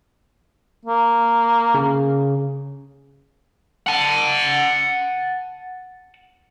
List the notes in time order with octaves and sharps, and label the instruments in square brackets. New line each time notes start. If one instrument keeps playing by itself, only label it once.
[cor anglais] A#3
[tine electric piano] C#3
[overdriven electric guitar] F#5 A5